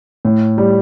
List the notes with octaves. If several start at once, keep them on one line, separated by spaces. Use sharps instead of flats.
A2
G3